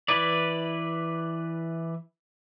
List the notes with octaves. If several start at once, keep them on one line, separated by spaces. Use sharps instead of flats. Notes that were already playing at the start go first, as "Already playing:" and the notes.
E3 E4 B4 D5